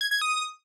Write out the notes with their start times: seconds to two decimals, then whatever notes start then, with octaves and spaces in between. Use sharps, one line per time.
0.01 G#6
0.11 G#6
0.21 D#6